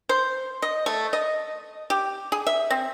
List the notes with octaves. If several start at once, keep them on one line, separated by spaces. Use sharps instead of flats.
C5
D#5
A3
D#5
G4
G#4
E5
C4